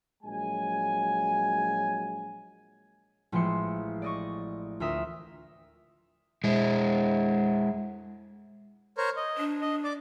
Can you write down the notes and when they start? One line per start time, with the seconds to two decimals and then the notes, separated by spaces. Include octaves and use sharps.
0.23 A#1 F#3 G#3 G#5
3.32 A1 F3 G#3 E5 C6 C#7
4.02 D5 D#5 C#6
4.80 D2 F4 A#4 E5 D#6
6.44 G#3 E4
8.98 A#4 C5 C#5
9.16 D#5
9.38 D4
9.61 D#5
9.84 D5 D6